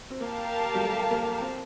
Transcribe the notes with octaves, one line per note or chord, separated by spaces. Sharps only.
C4
A#3 G4 A#4 F5 A5
G3
A3
A#3
C4